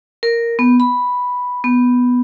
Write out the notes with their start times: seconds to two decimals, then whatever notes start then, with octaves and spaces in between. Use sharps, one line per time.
0.23 A#4
0.59 B3
0.80 B5
1.64 B3